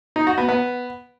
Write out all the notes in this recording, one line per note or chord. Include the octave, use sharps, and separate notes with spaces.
D#4
F#4
B3
B3